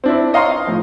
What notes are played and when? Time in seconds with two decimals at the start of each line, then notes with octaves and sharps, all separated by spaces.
0.04 C4 D4 E4
0.33 C#5 D#5 F5 A#5 C6 C#6
0.51 F5
0.67 A2 F3